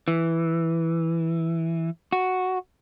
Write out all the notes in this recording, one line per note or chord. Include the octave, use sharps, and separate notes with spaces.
E3
F#4